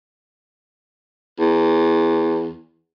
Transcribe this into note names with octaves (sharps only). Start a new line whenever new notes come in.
E2